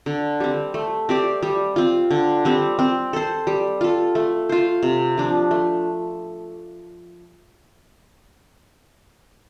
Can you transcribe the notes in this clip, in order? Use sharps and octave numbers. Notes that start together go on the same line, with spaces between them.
D3
G3 C4
A3
C4 G4 D5
G3
C4 F4
D3
G3 C4
C4
A4 C5
G3
F4 A4
A3
F4 C5
C3
F3 D4
A3